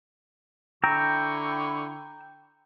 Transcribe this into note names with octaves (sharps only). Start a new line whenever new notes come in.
D3 E4 G5 A#5 C#6 E6